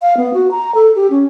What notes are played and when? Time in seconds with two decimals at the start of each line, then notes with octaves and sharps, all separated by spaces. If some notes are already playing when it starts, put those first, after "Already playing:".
0.02 F5
0.17 B3
0.34 F#4
0.51 A#5
0.75 A4
0.96 G4
1.10 C#4